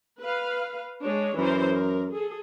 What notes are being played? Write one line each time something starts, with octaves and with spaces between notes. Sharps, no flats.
B4 F5
G#3 D4 C#5
F#2 E3 A#4 C5
A#4
G#4 A4